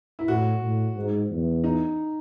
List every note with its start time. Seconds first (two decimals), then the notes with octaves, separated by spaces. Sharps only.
0.19 E4
0.28 A2 F#4
0.62 A2
0.96 G#2
1.30 E2
1.64 D#4